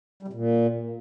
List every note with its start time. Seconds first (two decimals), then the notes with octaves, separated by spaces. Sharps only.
0.23 G3
0.28 C3
0.33 A#2